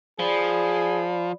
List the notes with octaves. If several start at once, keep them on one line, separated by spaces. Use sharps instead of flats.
F3 G#4 D5 B5